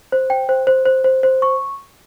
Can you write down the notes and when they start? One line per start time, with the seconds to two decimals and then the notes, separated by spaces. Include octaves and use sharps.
0.12 C5
0.30 G5
0.49 C5
0.67 C5
0.86 C5
1.04 C5
1.23 C5
1.42 C#6